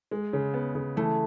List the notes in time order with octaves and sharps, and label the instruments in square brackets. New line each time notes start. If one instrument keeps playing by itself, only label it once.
[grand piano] G#3
C#3
B3
C#3
[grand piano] E3 [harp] A3